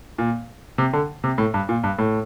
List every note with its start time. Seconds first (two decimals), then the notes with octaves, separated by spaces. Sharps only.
0.18 A#2
0.78 C3
0.93 D3
1.24 C3
1.38 A2
1.54 G2
1.69 A#2
1.84 G2
1.99 A2